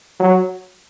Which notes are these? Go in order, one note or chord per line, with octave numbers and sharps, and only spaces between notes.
F#3